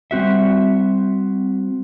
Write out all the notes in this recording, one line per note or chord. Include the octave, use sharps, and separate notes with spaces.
G3 C4 F#4 E5